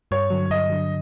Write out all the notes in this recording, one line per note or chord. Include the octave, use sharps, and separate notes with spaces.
G2 C#5
D3 F#3
G2 D#5
D3 F#3